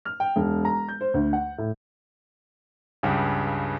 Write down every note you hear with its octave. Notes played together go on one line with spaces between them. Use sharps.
F6
G5
E1
A#5
G6
C5
D2
F#5
A2
C#2 G2 C#3